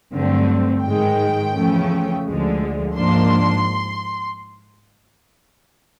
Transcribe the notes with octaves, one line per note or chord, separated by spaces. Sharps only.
G2 D3 F#3 A3 C4
G#2 D#3 G#3 G5
E2 C#3 F3 A3 C#4
D2 D3 F3 G#3
G#2 F3 A#3 D4 C6